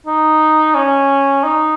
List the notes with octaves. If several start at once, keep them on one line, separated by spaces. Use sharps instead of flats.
D#4
C#4
D#4